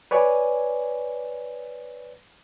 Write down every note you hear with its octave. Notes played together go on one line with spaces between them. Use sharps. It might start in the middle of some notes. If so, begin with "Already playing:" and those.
B4 C#5 D5 G#5